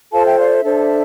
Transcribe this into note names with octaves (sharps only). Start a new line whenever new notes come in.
F4 A4 C5 F5 A5
E5 G5
D5 F5
E5
D4 A4 C5